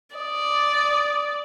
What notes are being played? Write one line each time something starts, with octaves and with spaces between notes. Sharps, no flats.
D5 D6 D#6